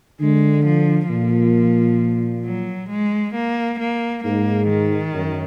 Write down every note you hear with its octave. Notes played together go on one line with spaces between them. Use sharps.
D3 G#3
F3
A#2 F3
F#3
G#3
A#3
A#3
G#2 A#3
D#3
F#2